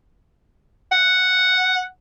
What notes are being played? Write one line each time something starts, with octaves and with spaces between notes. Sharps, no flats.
F#5